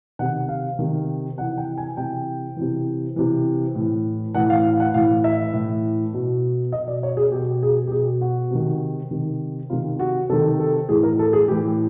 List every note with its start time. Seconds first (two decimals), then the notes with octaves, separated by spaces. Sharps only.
0.19 C3 D#3 F#5
0.49 F5
0.79 C3 D#3
1.37 C3 E3 F#5
1.58 G5
1.78 G#5
1.97 C3 E3 G5
2.57 C3 E3
3.16 C3 E3
3.75 A2
3.80 E3
4.35 A2 E3 F#5
4.50 F5
4.65 F5
4.80 F#5
4.94 A2 E3 F5
5.24 E5
5.53 A2 E3
6.14 B2
6.72 B2 D#5
6.88 D5
7.03 C#5
7.17 G#4
7.32 B2 G4
7.63 G#4
7.87 G4
7.92 B2 G#4
8.21 F#4
8.51 C3 D#3
9.11 C3 D#3
9.70 C3 D#3 F4
9.99 F#4
10.30 C3 D#3 A4
10.60 A4
10.89 A2 E3 G#4
11.03 A#4
11.19 A4
11.33 G#4
11.48 A2 E3 G4